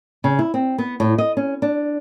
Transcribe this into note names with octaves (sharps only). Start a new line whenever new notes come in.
C#3
E4
C4
B3
A2
D#5
C#4
D4